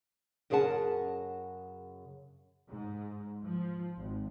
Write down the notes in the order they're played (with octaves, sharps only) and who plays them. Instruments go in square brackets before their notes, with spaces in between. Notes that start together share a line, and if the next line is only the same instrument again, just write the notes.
[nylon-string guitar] F#2 C#3 G#4 A#4 F#5 A5
[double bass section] G#2
F3
G#1